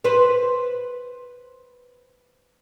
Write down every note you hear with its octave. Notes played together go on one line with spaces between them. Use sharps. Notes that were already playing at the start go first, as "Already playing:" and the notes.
B4 C5